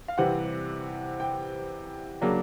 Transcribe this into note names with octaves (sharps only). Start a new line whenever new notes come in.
F5
C3 E3 G3 C4 F#5
G5
C#3 F#3 A#3 D4